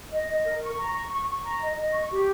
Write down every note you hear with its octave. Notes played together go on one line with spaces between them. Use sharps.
D#5
D#5
A#4
C#6
A#5
C#6
C#6
C#6
A#5
D#5
D#5
C#6
G4